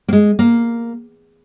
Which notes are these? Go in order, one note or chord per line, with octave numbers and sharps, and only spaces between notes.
A#3
G#3
A#3